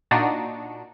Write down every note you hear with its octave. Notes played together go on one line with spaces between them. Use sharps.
A#2 D4 D#4 F#4